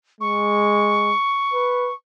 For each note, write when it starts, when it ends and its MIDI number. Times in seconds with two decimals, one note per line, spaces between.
0.21 1.14 56
0.21 1.93 85
1.54 1.91 71